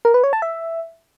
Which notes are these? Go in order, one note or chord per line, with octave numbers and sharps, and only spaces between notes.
A#4
B4
C#5
A5
E5